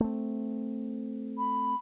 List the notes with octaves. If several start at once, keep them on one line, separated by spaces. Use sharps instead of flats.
A3 C4
B5